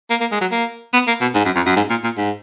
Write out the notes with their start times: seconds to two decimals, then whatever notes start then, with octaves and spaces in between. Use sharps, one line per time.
0.10 A#3
0.20 A#3
0.31 G#3
0.41 F#3
0.51 A#3
0.93 B3
1.07 A#3
1.21 B2
1.35 G#2
1.45 F#2
1.55 F2
1.66 F#2
1.76 G#2
1.90 A#2
2.04 A#2
2.17 G#2